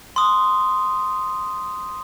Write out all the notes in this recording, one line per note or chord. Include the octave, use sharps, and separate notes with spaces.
C6 D#6